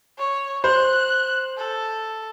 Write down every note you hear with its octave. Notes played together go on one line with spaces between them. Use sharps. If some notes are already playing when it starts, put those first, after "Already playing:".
C#5
C5 F#6
A4